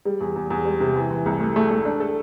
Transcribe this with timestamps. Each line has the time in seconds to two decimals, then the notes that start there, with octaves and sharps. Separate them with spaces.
0.05 G3
0.21 E2
0.36 E2
0.50 E2
0.65 G3
0.80 C3
0.96 E3
1.11 E3
1.26 C2
1.40 A3
1.56 A3
1.71 A3
1.85 D4
2.00 A4